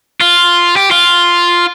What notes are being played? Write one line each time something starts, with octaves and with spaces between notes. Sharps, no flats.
F4
G4
F4